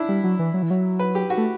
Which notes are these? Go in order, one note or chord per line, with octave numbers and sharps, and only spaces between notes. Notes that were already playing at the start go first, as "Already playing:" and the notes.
Already playing: D4 E4
G3
F#3
E3
F#3
E3
F#3
B4
G4
F#4
A3